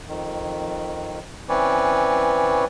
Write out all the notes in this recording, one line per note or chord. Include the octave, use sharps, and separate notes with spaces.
F2 D#3
E3 C4 C#4 B4 C#5 D5